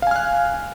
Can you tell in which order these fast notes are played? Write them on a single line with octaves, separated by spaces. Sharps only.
F5 G#5 F6 F#6